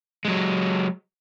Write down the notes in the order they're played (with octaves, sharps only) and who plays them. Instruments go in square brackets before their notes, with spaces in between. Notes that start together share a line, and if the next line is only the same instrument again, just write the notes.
[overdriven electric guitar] F#3 G#3